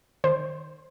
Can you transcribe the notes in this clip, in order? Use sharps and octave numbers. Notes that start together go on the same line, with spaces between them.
D#3 C5